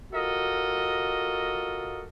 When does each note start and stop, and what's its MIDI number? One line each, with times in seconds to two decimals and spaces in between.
0.12 2.05 65
0.12 2.05 66
0.12 2.05 69
0.12 2.05 70
0.12 2.05 75